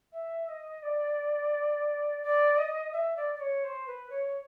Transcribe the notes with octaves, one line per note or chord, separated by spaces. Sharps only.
E5
D#5
D5
D5
D#5
E5
D5
D5
C#5
C5
B4
C#5